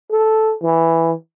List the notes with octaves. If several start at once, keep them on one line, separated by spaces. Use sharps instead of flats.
A4
E3